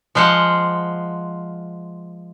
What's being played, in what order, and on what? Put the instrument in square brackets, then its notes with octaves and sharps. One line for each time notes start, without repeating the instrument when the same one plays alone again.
[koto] F3 G#3 C5 F5 F#5